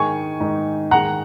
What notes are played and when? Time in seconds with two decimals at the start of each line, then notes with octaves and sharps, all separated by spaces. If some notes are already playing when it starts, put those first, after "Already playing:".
Already playing: G#2 D#3 G#3 G#5 C#6
0.40 G#2 D#3 G#3
0.91 G#2 D#3 G#3 F#5 A#5